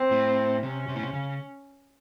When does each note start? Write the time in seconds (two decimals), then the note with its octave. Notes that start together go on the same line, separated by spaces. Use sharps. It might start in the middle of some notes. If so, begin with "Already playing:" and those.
Already playing: C4
0.11 A2
0.62 C3 C#4
0.88 C3
0.95 A2
1.03 C3
1.13 C#3